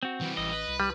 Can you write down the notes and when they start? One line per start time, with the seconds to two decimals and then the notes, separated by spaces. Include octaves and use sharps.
0.03 C4 F#4
0.21 E3 G3
0.37 A1 D#5
0.52 B4
0.67 C2
0.80 G3